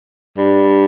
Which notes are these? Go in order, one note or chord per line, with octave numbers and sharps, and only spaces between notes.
G2